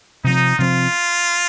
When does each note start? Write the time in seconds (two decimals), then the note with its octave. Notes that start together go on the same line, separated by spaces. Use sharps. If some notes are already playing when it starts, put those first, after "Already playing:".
0.24 C3 F3 C4 D#4
0.59 C3 F3 C4 F4